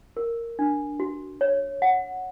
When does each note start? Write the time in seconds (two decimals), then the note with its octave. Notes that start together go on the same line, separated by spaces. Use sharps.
0.17 A#4
0.59 D4
1.00 F#4
1.41 C#5
1.82 F#5